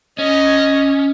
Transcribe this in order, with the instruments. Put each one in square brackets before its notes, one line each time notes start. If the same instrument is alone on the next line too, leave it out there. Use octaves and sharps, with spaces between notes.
[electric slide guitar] C#4 [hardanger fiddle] D#5